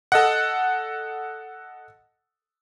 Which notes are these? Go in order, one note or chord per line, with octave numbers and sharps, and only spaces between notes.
A4 D#5 F#5